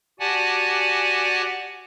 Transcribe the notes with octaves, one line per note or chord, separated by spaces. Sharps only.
F#4 G4 D5 F#5 G#5 A5